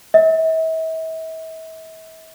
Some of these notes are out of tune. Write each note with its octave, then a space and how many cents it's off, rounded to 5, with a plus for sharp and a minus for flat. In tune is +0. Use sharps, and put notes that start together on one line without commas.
E5 -40